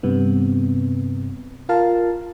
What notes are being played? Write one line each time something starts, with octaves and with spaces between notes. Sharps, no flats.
G2 C3 B3
F4 A#4 F5 A5